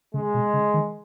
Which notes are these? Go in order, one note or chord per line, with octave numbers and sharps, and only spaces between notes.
C#3 G#3
B2
C#3
D#3